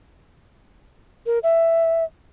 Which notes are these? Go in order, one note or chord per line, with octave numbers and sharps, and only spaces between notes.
A#4
E5